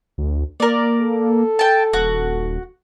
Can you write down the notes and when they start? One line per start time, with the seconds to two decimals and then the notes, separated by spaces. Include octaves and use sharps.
0.18 D2
0.60 A#3 A#4 D5
1.01 A4
1.59 G5 A5
1.93 D#1 F#4